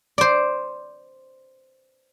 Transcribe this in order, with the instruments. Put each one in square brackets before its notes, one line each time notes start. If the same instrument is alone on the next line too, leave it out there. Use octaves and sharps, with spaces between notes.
[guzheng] C5 D5